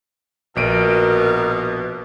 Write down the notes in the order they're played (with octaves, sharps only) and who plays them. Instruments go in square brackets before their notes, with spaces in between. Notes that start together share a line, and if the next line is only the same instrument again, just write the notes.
[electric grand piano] A#1 D7 D#7 [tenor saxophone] B2 [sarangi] A#4